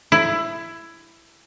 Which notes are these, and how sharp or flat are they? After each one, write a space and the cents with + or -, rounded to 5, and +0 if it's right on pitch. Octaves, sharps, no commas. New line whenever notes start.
E4 +15